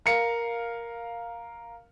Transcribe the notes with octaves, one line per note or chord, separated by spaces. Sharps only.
A#4 F5 C#7